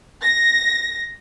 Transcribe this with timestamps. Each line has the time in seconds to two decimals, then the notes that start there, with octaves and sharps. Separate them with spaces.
0.23 A#6